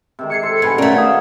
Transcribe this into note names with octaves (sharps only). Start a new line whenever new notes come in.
C3 D#3 G#3
C3 G#4 G#6 C7 C#7
A4 C5
G2 B2 G#5 B5 G#6
A3 A#3 C#4 F#4 D5 A#5
D#4 F5 D#6 G#6